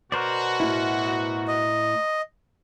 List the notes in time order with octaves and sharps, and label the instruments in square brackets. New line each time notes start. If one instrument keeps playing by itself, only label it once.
[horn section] B2 F#4 [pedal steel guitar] A#4 C5 D5
[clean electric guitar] A2 E4
[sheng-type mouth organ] D#5